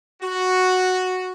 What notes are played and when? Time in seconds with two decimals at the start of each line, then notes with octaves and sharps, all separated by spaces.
0.23 F#4